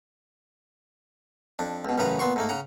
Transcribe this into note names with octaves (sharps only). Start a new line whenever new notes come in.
F2 D4
C#2 B2
A1 F#2 A2 C#3 B4 A#5
A#2 B3 C6 C#6
G#2 A3 A#3
C#3 F#5 A#5